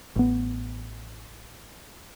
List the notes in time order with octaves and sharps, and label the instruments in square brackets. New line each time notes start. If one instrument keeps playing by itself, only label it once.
[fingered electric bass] A1 B3